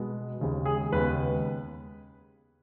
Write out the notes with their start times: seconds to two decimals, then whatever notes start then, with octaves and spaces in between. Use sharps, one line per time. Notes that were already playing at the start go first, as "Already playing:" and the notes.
Already playing: B2 G#3 B3
0.38 D#2 C#3 G#3
0.65 G#4
0.92 D#2 C#3 G#3 B3 B4